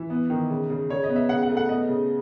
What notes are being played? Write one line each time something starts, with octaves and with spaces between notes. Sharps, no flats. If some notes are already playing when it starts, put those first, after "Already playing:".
Already playing: E3 E5
B3
D#3
C#3
C#3
C#3 C#5
D#5
B3
E5
C#3 F#5
F#5
A3
F#5
B3 D#5
C#3